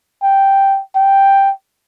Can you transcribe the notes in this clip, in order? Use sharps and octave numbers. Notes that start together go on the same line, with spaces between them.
G5
G5